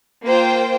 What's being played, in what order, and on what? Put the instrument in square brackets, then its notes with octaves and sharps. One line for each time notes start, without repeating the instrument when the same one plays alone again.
[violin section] A#3 F4 C5 G5